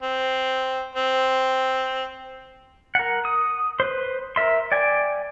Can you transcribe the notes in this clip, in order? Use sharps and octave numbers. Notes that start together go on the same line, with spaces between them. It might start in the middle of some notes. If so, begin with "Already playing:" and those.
C4
C4
A#4 F#5
D#6
B4 C5
A#4 E5 C6
D5 G5 G#5